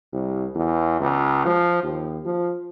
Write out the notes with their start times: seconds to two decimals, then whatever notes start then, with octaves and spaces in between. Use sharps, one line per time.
0.13 C2
0.55 E2
1.01 C#2
1.46 F3
1.84 D#2
2.25 F3